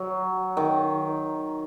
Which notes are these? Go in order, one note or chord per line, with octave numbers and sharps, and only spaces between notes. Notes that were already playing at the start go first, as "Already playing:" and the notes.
Already playing: F#3
D#3